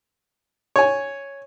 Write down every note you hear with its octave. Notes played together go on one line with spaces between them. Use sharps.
C#5 G#5